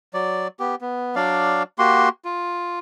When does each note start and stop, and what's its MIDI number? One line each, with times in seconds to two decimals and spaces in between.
0.14 0.48 54
0.14 0.48 74
0.60 0.75 59
0.60 0.75 67
0.81 1.15 59
1.16 1.63 54
1.16 1.63 62
1.16 1.63 74
1.16 1.63 77
1.79 2.09 58
1.79 2.09 66
1.79 2.09 67
1.79 2.09 84
2.25 2.79 65